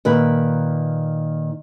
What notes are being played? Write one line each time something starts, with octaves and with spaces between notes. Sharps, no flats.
A#2 D#3 B4